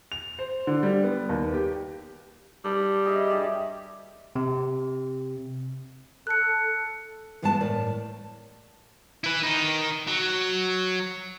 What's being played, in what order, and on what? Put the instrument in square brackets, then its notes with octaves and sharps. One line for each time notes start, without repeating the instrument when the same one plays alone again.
[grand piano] F7
C5
D3
G3
B3
D#2
G4
[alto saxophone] G3 [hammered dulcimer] A4
[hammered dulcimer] G#4 D#5 E5
G2 G4 D5
[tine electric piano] C3
[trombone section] A4 [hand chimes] F#6 C#7
[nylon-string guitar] G2 E3 G#3 B3 A4 A5
A2 A#4 D5
[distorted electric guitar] E4 B4
D#3 D#4
F#3